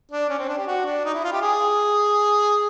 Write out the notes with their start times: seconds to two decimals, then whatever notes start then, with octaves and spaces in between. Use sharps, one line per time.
0.12 D4
0.29 C#4
0.39 C4
0.48 D4
0.58 G4
0.67 F#4
0.86 D4
1.05 D#4
1.14 E4
1.24 F4
1.32 G4
1.42 G#4